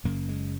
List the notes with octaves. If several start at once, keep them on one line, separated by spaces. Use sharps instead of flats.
F#1 F#2 C#3 A#3
G#3